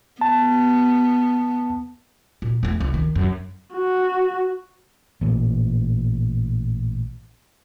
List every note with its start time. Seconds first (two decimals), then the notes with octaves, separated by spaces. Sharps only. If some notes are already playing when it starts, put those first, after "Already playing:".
0.21 B3 A5
2.42 A#2
2.63 E2 A3
2.80 C2
2.94 D#3
3.16 F#2
3.74 F#4
5.21 A1 A#2